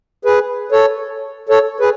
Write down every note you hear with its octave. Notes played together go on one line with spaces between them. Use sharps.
G#4 B4
A4 C#5
A4 C#5
G#4 B4